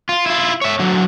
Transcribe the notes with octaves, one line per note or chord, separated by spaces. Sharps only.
F4
E4 F4
C#5 E5
D3 F#3